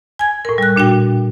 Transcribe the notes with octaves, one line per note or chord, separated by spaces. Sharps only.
G#5 G#6
A2 A#4
G3 F#6
A#2 D4 F#4 G5